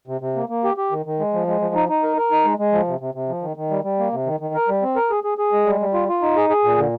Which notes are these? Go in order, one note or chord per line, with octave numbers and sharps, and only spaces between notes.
C3
C3
A#3
A#3
G4
G4
D#3
D#3
G#3
F3
G#3
F3
D#4
D#4
A#4
A#4
D#4
G#3
G#3
F3
C3
C3
C3
F3
D#3
D#3
G3
G3
A#3
C3
D#3
D#3
A#4
G3
C4
A#4
G#4
G#4
G#4
G#3
G3
G3
F4
F4
D#4
G#4
G#4
A#2
D3